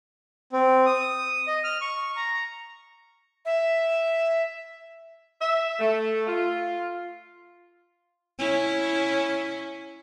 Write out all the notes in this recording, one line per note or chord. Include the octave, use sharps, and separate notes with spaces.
C4
D#6
D#5
F6
C#6
A#5
E5
E5
A3
F4
C#4 E4